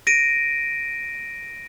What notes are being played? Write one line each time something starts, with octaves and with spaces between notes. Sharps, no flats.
A#6 D7 D#7